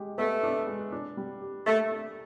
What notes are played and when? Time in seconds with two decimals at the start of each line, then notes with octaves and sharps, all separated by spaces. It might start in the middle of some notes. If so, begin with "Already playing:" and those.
Already playing: G#3 G4
0.18 A3 B3
0.43 D4
0.67 G#3
0.92 D4
1.17 G3
1.42 G4
1.67 A3 A#3
1.91 D4